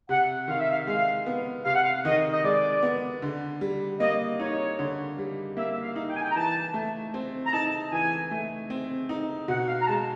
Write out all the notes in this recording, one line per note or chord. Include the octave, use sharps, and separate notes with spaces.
C3 F#5
D#3 F5
E5
F5
G#3 F5
B3
C3 F5
F#5
F5
D#3 D#5
D#5
G#3 D5
B3
D3
G3
A#3 D#5
D#4 C#5
D3
G3
A#3 E5
F5
D#4
G5
G#5
G5
A#5
E3 A5
A3
C4
A#5
D#4 A5
E3 G#5
A3
C4
D#4
B2 F#5
F5
A#5
G#3 A5